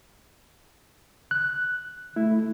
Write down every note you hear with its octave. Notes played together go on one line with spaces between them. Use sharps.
F#6
A3 E4